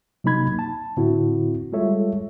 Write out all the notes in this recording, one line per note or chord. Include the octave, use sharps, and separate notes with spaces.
C3 F#3 A#3 D#4 B5 G#6
A5
A2 D3 C4 E4 F#4
G3 G#3 F4 A4 C#5 E5